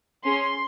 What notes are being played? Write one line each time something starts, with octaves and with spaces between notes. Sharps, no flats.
C#4 G#4 C6